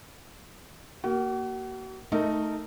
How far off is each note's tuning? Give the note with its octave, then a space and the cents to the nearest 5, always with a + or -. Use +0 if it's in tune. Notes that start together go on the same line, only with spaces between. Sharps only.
A#3 +0 F#4 +40
A3 +0 D#4 +0 A#4 -20